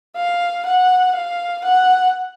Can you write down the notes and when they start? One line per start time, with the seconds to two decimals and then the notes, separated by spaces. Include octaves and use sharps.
0.16 F5
0.65 F#5
1.15 F5
1.64 F#5